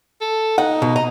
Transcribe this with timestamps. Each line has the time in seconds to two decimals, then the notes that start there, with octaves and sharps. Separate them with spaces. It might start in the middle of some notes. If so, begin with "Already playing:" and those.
0.21 A4
0.58 D#4 F#5
0.82 B2
0.96 D#5 A#5